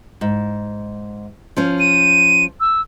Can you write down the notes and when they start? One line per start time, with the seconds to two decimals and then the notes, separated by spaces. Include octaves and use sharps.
0.21 G#2
1.57 F3 C#4
1.80 D#7
2.60 E6